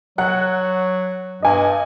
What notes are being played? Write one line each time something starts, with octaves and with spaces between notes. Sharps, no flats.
F#3 F#5 F#6
G2 D#5 G#5